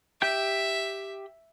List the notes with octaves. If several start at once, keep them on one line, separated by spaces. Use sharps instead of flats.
G4 E5 G5 G6